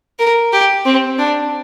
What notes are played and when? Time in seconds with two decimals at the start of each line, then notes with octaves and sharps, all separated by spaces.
0.19 A#4
0.53 G4
0.85 C4
1.18 D4